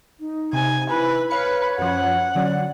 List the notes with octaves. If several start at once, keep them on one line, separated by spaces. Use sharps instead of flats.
D#4
C3 G#5
E4 B4
B4 C#5 F5 C#7
F#2 F3 F#5
D3 F#3 C#4 D5